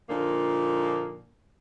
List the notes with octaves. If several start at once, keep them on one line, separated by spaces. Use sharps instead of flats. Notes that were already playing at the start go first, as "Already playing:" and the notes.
A#2 D3 F3 A#3 D4 D#4